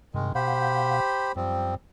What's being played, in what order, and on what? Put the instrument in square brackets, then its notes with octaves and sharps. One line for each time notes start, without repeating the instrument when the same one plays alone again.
[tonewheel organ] G2 C3 [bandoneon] D#3 G#3
[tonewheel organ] B2 F5 F#5 [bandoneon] G4 C5 B5
[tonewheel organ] F#2 [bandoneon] F3 G3 C4